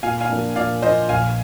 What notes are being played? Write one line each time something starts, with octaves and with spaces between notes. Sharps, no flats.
A#2 F5 G#5
F5 G#5
F3 A#3 D4
A#2 D5 F5
F3 A#3 D4 C5 D#5
A#1 F5 G#5